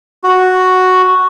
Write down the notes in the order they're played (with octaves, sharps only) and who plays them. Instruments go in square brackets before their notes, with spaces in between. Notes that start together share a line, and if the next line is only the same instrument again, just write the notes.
[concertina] F#4